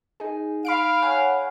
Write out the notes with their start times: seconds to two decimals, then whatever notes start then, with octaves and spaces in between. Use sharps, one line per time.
0.20 D#4 G#4
0.65 F5 B5 F6 D7
1.02 C#5 F#5 G#5